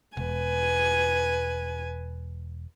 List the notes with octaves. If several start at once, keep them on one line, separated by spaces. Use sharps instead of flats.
E1 B4 G#5